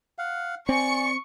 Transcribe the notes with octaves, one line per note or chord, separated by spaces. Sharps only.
F5 F#5
C4 D5 G#5 C#6 C#7